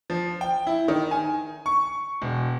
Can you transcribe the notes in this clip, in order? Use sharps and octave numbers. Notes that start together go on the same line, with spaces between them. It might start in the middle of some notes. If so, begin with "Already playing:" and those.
F3
G5
E4
D#3
G#5
C#6
E1